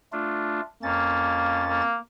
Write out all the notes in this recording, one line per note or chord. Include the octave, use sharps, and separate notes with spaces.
A3 D4 F4
F2 A#3 C#4 A6
A#3